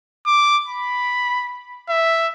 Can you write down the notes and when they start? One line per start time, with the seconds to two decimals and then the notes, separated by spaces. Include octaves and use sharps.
0.26 D6
0.67 B5
1.89 E5